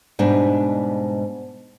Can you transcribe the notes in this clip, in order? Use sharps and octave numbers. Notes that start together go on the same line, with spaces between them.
G#2 B2 G3 D4